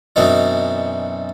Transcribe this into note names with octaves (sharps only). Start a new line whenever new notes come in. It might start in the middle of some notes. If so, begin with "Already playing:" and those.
F#2 B2 E3 C4 D4 D#4